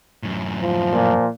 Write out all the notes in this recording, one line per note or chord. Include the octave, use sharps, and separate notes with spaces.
F#2 A2
F3
A#2